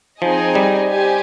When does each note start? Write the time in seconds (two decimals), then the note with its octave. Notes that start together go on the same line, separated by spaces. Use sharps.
0.21 F3 C4 D#4 G#4 D#5 G#5
0.55 G3
0.89 G4 C5 D#5 G#5